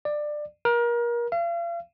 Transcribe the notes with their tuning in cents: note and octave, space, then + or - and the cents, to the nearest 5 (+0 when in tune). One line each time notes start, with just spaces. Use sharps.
D5 +20
A#4 +30
F5 -40